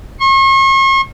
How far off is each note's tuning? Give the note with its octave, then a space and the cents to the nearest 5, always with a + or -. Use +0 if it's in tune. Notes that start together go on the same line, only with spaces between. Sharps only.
C#6 -45